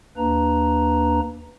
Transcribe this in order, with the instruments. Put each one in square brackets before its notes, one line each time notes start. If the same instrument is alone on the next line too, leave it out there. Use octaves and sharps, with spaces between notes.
[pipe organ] D#2 A#3 D4 B4 A#5